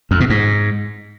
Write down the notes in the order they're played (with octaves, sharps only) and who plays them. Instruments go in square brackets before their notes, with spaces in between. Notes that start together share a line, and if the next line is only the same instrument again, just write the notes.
[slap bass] F2
B2
G#2